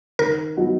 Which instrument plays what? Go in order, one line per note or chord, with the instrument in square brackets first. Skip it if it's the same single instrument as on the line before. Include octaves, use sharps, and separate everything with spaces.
[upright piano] D#3 [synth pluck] A#4
[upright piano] F#3 B3 D#4 F#4